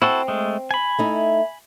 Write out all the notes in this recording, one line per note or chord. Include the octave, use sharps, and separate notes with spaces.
C4 E4 F#4 A4
G#3 A3
G#5 B5
A3 D#4 E4